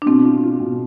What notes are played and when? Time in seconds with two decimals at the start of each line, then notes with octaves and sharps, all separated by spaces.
0.02 D4
0.06 B2 C4
0.25 F4
0.43 F4
0.60 B2